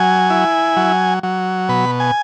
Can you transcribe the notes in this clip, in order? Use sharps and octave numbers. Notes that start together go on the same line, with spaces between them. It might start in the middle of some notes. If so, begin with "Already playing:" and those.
Already playing: F#3 G#5
E4
F#3
F#3
B2 B5
G#5